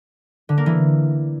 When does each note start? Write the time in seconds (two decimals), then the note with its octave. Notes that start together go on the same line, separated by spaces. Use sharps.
0.49 D3
0.58 A#3
0.66 E3